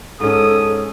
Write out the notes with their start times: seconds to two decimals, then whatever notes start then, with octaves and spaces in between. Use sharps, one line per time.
0.20 G#2 C#4 A4 D#6